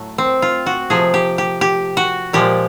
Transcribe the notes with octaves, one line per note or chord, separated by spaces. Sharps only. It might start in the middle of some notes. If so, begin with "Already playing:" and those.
Already playing: A2 F#3 A3
C4
F4
F#4
C3 F3 A3 G#4
G4
G4
G4
F#4
A#2 F3 G#3 G4